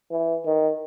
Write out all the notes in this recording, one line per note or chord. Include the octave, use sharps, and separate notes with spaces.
E3
D#3